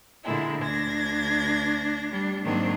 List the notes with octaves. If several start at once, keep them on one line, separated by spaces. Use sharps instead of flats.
A#2 D3 G#3 A#3 E4
D2 D4 G#6 A#6
G3 D4
G#2 D#3 F#3 A#3 C4 D4